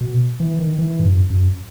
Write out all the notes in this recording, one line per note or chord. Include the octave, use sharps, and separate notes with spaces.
B2
E3
D#3
E3
G#2
F#2
F#2